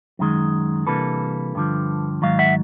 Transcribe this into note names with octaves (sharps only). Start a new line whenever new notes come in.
F#2 D#3 G#3
C3 E3 G3 A#3 D4 A4 B4
G2 D3 F3
G#2 D#3 F#3 F5
E5 F#5